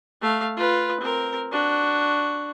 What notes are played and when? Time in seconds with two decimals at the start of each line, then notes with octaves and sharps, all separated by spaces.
0.21 A3 F5
0.57 F4 B4
1.01 C4 A#4
1.52 D4 F#4